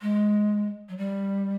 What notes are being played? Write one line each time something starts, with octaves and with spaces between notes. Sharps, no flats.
G#3
F#3
G3